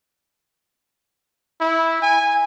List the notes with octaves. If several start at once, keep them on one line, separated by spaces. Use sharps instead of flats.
E4
G#5